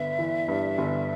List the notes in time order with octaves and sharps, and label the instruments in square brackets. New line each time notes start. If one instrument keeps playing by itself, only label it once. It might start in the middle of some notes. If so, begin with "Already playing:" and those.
Already playing: [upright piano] G1 B3 [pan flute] E5
[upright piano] E3
G2
G1